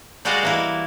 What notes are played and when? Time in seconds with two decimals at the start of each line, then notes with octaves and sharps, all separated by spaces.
0.25 G3 G#3 F#4 D5 D#5 F5
0.43 E3 A#3 E4